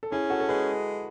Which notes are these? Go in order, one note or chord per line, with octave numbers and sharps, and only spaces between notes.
A4
C#4 E4 G#4
F#4 A4
A4
G#3 G#4 B4